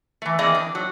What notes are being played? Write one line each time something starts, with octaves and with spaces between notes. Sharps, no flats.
E3 A3
E3 A#3 C4 G#4 D5 D#5
D4
F#3